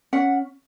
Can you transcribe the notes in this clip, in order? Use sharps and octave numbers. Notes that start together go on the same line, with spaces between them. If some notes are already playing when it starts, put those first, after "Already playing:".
C#4 F#5